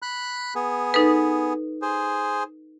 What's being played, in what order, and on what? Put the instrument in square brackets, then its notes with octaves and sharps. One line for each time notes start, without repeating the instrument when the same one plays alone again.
[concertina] B5 F#6
B3 G#4
[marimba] D#4 A4 B4
[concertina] G#4 C5